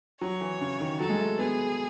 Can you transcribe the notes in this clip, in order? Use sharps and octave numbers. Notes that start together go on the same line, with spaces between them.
F#3 C#5
E3
C#3
D#3
F#3 A4
G#3
A3
B3 G#4